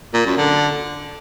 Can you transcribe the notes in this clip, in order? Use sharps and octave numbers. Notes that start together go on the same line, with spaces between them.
A#2
F#2
D3